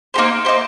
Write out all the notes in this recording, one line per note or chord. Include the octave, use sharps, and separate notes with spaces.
A#3 D#4 G4 C5
A#3 D#4 G4 C5